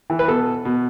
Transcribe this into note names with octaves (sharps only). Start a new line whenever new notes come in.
E3
B4
B2 A4
B2